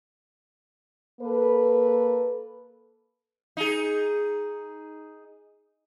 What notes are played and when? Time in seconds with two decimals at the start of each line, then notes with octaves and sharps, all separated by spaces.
1.21 A#3 A4 B4
3.57 D#4 G#4